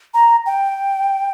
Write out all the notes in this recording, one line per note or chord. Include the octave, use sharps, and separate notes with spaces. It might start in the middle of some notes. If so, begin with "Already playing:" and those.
A#5
G5